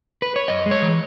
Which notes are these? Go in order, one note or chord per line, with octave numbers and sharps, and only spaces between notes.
B4
C#5
F#2 D#5
G#3
C#5
E3